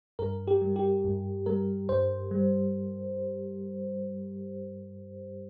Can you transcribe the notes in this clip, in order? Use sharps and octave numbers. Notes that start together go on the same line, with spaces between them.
G2 A#4
G4
G3
G4
G2
G3 A#4
G2 C5
G3